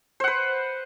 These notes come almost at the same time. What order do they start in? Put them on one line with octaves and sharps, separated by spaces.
C5 F#5 B4